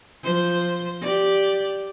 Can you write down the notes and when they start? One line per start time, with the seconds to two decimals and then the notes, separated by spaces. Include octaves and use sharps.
0.23 F3 C5
1.01 G4 D5